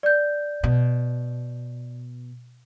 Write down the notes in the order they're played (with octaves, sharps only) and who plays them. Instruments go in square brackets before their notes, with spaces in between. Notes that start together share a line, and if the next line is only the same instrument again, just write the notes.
[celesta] D5 G6
[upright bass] B2